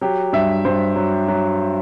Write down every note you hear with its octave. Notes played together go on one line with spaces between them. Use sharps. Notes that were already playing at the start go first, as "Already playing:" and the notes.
F#3 G4
G2 E5
G2 C5
F#3
F#3